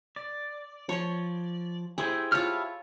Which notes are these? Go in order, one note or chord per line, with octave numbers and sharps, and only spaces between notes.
D5
F3 C#5 C6
E4 G4 G#4 C5
E4 F4 C#5 A5 F6